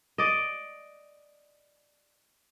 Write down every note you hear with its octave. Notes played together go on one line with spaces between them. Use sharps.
D5 D#5